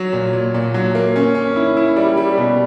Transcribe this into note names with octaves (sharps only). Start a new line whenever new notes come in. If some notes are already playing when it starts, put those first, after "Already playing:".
Already playing: F#3
A#2
A#2
A#2
F#3
A#3
C#4
C#4
E4
E4
G3
G3
B2